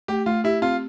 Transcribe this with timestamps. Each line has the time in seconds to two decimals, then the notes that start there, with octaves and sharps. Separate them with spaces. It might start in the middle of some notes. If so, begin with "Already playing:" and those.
0.08 A3 G4
0.26 A3 F4
0.44 E4 G4
0.62 C4 F4